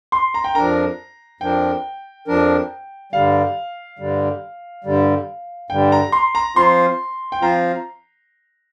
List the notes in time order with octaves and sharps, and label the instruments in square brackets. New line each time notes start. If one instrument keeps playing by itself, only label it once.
[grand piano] C6
A#5
G5
[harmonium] F2 F3 D4 A#4 [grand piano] A#5
[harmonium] F2 F3 D4 A#4 [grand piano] G5
[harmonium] F2 F3 D4 A#4
[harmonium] G2 D3 G3 [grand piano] F5
[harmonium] G2 D3 G3
G2 D3 G3
[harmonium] G2 D3 G3 [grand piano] G5
[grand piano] A#5
C6
A#5
[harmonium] F3 C4 F4 C5 F5 [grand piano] C6
[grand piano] G5
[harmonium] F3 C4 F4 C5 F5 [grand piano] A#5